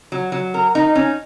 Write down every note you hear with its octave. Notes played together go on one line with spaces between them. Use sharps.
F#3
F#3
A#4
D#4
C#4